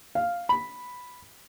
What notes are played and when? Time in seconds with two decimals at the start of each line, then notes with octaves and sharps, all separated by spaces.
0.15 F5
0.49 B5